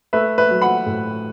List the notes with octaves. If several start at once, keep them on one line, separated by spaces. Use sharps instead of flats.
A3 B4 E5
B4 E5
F#3
F#5 B5
A2